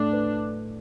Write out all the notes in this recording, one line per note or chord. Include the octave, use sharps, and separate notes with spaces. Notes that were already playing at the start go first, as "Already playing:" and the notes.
Already playing: A2 A3 D4
B4